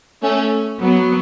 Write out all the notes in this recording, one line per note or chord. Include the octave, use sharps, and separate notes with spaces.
A3 C#4
F#3 B3